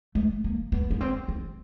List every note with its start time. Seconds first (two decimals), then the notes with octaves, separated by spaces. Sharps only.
0.15 A3
0.44 A#3
0.72 B3
0.90 B3
1.01 C4
1.28 C4